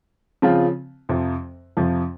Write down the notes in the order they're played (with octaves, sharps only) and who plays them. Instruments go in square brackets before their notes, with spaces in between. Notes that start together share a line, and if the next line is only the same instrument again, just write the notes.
[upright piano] C#3 F3 C4 F4
F2 C3 F3
F2 C3 F3